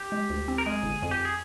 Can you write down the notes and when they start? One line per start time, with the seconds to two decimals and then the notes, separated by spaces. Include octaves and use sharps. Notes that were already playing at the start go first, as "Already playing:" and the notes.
Already playing: G4
0.12 G#3
0.30 D2
0.48 C4
0.58 A#4
0.65 G#3 G#4
0.83 G1
1.02 F2
1.11 G4
1.25 G#4